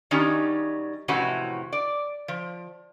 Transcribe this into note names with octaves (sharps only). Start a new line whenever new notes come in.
D#3 F#3 G3 C#4 D#4
F2 A2 C3 E3 C#4 F#4
D5
F3